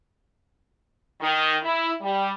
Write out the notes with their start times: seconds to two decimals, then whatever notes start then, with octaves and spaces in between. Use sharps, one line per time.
1.21 D#3
1.63 E4
2.02 G3